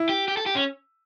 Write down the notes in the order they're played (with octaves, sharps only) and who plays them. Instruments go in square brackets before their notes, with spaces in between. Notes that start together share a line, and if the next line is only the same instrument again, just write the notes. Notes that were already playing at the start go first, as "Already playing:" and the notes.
Already playing: [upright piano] E4
[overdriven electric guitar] G4
G4
A4
G4
C#4